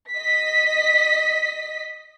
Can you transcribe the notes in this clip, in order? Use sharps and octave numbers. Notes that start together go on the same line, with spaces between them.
D#5 B6